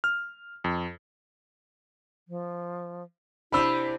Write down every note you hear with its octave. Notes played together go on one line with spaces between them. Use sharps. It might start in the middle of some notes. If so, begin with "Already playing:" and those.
F6
F2
F3
C3 D4 E4 C5 B5 E6